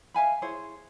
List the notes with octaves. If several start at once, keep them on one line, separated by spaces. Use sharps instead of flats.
E5 F5 G#5 B5
E4 G#4 C5 C#5